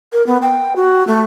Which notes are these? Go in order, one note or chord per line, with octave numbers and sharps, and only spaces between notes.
A#4
B3
G5
F#4
A3